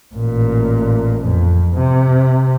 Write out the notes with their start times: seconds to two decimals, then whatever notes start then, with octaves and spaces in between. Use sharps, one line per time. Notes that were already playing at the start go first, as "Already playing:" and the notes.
0.14 A1 A#2
1.24 F2
1.74 C3